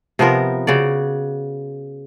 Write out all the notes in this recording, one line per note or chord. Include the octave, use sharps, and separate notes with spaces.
C3 F3 B3 A#4
C#3 F#4 D5